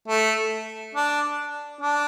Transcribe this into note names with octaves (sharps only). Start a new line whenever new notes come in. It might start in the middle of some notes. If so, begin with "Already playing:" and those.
A3
D4
D4